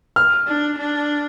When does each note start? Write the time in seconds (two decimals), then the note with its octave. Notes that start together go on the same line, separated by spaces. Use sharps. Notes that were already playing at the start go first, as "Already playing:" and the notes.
0.16 F6
0.47 D4
0.79 D4